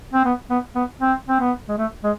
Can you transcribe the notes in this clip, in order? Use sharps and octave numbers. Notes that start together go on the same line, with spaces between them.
C4
B3
B3
B3
C4
C4
B3
G#3
A3
G#3